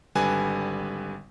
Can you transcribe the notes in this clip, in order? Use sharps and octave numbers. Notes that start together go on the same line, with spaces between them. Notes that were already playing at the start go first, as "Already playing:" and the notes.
G#1 D3 G3 B4 G#5